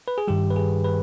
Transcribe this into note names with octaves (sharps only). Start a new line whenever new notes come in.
B4
G#4
G2 D#3 G3 G4
B4
G#4
B4